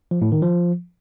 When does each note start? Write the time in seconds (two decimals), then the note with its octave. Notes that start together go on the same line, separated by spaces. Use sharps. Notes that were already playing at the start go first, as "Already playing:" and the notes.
0.11 F3
0.22 A2
0.32 D#3
0.42 F3